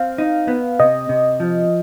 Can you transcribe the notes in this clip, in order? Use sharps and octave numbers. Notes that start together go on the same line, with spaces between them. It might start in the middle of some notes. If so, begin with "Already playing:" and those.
Already playing: C4 F5
D#4
B3
C3 D#5
C3
F3